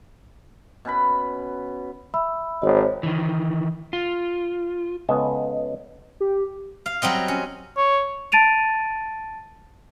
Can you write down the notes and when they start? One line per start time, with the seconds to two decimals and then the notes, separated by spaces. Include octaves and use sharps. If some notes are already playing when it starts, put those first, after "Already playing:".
0.85 B2 C#4 B4 B5
2.14 E5 B5 E6
2.62 G#1 C5 C#5 D#5
3.03 D#3 E3
3.93 F4
5.09 C#2 B3 A4 D#5 G#5 A5
6.20 G4
6.86 F5
7.02 F#3 G3 C4 D#5
7.28 C#4
7.77 C#5
8.32 A5 A6 D7 D#7 F7